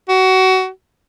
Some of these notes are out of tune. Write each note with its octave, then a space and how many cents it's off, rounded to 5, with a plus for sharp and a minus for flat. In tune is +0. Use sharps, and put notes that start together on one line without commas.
F#4 +25